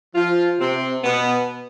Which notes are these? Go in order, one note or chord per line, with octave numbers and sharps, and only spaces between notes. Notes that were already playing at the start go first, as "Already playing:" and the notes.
F3 F4
C3 C4
B2 B3